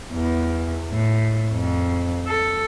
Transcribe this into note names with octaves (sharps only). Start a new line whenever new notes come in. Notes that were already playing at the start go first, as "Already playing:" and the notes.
E2
A2
F2
A4